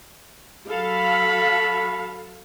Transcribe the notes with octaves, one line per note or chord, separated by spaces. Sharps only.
F#3 A4 F5 B5